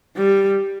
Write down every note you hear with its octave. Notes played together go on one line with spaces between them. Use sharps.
G3